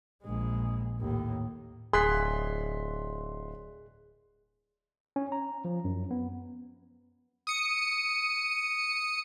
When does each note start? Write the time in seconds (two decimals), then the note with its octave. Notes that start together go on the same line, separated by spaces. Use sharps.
0.23 A#1 G#3
1.00 D#2 A2
1.93 D1 G#4 C6 F#6 B6
5.16 C#4
5.32 A#5
5.65 F3
5.85 F#2
6.11 B3
7.47 D#6 C#7